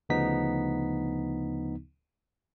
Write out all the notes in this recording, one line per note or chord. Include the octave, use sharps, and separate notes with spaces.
D2 C#3 F3 B3 D#4 B6